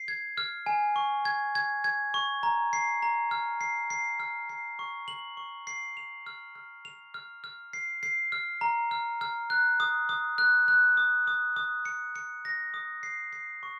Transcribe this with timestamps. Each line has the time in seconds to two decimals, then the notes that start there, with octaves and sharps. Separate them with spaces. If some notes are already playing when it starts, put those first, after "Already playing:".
Already playing: C7
0.08 G#6
0.38 F6
0.66 G#5
0.96 C#6
1.25 G#6
1.55 G#6
1.84 G#6
2.14 C#6
2.43 A#5
2.73 C7
3.02 A#5
3.31 F6
3.61 C7
3.90 C7
4.20 F6
4.49 C7
4.79 C#6
5.08 F#7
5.37 C#6
5.67 C7
5.97 F7
6.26 F6
6.55 F6
6.85 F7
7.14 F6
7.44 F6
7.73 C7
8.03 C7
8.32 F6
8.61 A#5
8.91 F6
9.21 F6
9.50 F#6
9.80 D#6
10.09 D#6
10.38 F#6
10.68 F#6
10.97 D#6
11.27 D#6
11.56 D#6
11.85 C#7
12.16 C#7
12.45 A#6
12.74 D#6
13.03 C7
13.33 C7
13.63 C#6